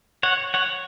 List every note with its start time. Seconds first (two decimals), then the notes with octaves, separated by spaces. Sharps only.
0.23 C#5 F#5
0.54 C#5 F#5